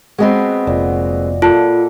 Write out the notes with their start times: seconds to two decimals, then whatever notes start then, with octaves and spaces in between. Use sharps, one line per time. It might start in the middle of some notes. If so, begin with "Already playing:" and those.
0.18 G#3 B3 C4 F#4 D#5 B5
0.67 F1 A#2
1.42 A#2 F4 A4